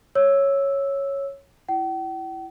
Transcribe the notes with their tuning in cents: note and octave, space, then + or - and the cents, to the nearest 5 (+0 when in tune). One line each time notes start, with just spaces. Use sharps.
C#5 -5 E6 +0
E4 +15 G5 -45